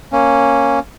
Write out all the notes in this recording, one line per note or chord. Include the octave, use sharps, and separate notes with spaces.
A#3 C#4